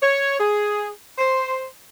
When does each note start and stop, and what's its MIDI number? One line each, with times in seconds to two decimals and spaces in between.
0.02 0.37 73
0.40 0.88 68
1.18 1.66 72